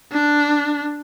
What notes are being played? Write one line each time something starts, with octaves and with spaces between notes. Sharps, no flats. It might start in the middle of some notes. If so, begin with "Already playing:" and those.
D4